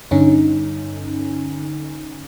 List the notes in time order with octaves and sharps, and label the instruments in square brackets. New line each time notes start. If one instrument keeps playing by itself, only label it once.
[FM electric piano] G2 D3 C#4 D#4